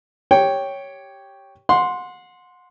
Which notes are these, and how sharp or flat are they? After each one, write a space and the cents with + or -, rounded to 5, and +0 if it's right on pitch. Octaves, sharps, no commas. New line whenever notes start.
G4 +0 C#5 +0 G5 +0
F#5 -30 C6 +0